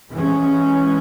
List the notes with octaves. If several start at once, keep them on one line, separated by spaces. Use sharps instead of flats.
E3 G#3 C#4